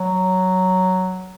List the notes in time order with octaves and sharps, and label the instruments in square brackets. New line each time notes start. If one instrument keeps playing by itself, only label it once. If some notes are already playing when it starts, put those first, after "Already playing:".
Already playing: [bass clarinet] F#3